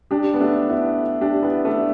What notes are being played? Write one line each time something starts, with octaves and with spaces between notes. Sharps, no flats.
D4 G4
B3
A3 D4
B3 E4
D4 G4
B3 E4
A3 D4